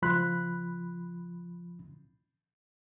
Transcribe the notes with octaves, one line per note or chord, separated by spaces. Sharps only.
C#2 F3 B5 C6 F#6